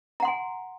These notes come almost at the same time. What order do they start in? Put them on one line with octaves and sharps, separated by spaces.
A#5 F#5 C6 G#5